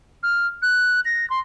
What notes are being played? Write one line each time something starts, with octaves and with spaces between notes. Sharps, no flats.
F6
F#6
A#6
C6